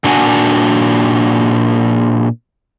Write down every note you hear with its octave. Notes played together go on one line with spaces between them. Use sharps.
A#2 D4 F#4 F#5 G#5